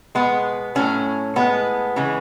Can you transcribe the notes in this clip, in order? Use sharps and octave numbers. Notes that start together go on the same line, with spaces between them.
B2 G#3 B3
A2 F#3 A3 C#4
A2 G#3 B3
C#3 E3 G#3